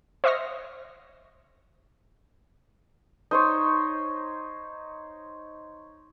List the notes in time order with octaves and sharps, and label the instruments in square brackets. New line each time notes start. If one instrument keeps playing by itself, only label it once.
[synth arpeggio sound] C5 D#5 E5 C#6 F6 A#6
[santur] D#4 C5 C#5